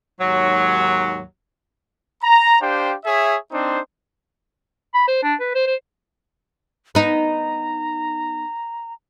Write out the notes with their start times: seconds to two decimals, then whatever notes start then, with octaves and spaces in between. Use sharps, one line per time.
0.21 D#2 G#2 F#3
2.23 A#5
2.61 D4 G4 C5 F5 G5
3.05 G#4 C#5 E5
3.52 C4 D4 D#4 C5
4.94 B5
5.08 C5
5.23 D4
5.40 B4
5.55 C5
5.66 C5
6.95 B3 D#4 A#5